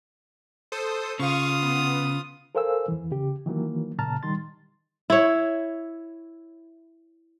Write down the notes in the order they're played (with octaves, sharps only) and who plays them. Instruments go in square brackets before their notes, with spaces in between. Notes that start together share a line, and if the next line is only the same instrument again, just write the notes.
[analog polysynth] A4 C5 D#6
[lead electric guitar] C#3 [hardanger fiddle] F4 D#6 [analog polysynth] F5 C#6
[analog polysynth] B3
[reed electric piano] A4 A#4 C5 F5 G#5 E6
E2 E3
C#3 G4
D#3 E3 F#3 A#3
A#2 C#3 A5 A#5 F6 A6
D#3 G3 C6 A6
[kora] E4 C#5